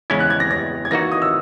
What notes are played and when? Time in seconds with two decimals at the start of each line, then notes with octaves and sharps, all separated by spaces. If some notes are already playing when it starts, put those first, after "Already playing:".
0.10 E2 C#3 G#3 C#4 E4 G#6
0.20 F#6
0.30 G#6
0.40 A#6
0.51 A#6
0.85 G#6
0.91 E3 A#3 D#4 F#4 A#6
1.12 D#6
1.22 E6